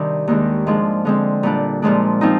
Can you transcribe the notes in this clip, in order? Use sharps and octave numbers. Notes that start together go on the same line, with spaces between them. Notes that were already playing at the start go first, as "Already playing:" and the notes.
Already playing: C3 D#3 G3 D4
D#2 D#3 G#3 D4
G#2 F3 G#3 D4
D3 G#3 C4
A#2 G3 D4
A#2 F3 G#3 D4
F3 C4 D#4